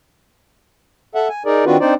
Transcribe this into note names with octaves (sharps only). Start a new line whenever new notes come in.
A4 E5 F#5
G#5
D#4 G#4 A#4 D5
D#3 C4 D4 F4 F#4 B4
C4 D4 D#4 C5 D5